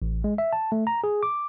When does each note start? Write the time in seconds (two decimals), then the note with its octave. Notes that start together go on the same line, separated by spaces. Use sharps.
0.02 A1
0.24 G#3
0.38 E5
0.53 A5
0.72 A3
0.87 A#5
1.04 G#4
1.23 D6